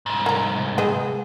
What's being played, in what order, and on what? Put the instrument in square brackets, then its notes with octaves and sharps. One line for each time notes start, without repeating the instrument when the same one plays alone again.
[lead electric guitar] C2 G#2
[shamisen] A#3 A#5
[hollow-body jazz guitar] G#3 G#4 D#5 [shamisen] B3 C4